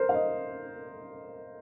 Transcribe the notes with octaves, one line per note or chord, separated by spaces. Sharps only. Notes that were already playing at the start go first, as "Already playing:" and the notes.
Already playing: A#4 C5
F5
D#5